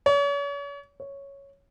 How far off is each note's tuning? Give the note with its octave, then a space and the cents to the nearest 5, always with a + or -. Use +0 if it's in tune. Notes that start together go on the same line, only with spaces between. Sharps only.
C#5 +40
C#5 +0